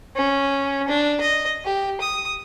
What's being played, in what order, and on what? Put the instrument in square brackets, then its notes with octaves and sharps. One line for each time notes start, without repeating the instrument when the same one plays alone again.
[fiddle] C#4
D4
D#5
G4
D#6